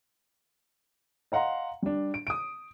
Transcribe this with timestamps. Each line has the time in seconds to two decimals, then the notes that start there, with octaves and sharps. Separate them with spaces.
1.32 D#5 F5 F#5 A#5 C6
1.83 G3 D4
2.14 D7
2.27 D#6 D7